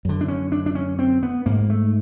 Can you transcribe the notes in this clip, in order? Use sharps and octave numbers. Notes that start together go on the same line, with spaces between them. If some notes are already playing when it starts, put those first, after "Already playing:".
F#2 D3
D4
C#4
D4
D4
C#4
C4
B3
G#2 A#3
A3